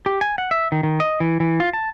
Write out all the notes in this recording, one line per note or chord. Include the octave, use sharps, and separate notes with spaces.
G4
G#5
F#5
E5
D#3
D#3
D#5
E3
E3
F4
A5